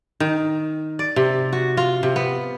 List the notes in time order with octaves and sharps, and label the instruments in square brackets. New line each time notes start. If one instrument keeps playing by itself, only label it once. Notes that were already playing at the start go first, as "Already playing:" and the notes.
[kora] D#3
D5
C3
F#4
F4
C3
B3